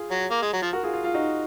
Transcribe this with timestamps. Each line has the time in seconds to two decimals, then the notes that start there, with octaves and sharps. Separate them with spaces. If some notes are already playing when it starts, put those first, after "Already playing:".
Already playing: F4 G#4
0.11 F#3
0.31 A#3
0.42 G#3
0.53 F#3
0.62 F3
0.73 F#4 A#4
0.83 F4 G#4
0.94 F4
1.04 F4
1.14 D#4 F#4